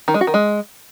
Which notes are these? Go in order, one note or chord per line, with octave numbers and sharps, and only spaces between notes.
D#3
G#3
F#4
D#3
G#3